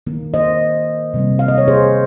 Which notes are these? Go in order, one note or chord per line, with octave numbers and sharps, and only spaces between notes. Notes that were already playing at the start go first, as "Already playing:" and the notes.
D#3 A#3
C5 D#5
C3 G3 A#3
F5
D#5
C#5
G#4 C5